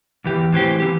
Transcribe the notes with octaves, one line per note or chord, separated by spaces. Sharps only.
E2 E3 G4
A2 E3 C4 G4
E3 C4 G4